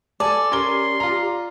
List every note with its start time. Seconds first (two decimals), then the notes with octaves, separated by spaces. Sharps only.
0.20 A4 D5 G#5 A5
0.51 C#4 G4 A#4 C6 G7
1.00 F4 A#5